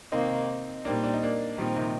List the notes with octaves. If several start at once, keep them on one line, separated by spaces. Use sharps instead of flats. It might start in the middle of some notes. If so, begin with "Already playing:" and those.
C3 D#3 A#3 C4 D#4
A#2 G3 A#3 C4 D4 D#4
D4
D#4
A#3 D4
A#2 D#3 F3 G3 C4 D#4
C3 D#3